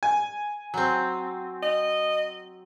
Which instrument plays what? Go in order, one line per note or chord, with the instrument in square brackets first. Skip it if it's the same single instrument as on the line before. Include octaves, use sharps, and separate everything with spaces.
[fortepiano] G#5
[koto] F#3 C4
[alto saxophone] D#5